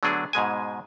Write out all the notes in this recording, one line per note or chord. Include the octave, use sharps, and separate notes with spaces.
D3 F#3 A3 B3 D4 G#4
G#2 B2 G#3 G#5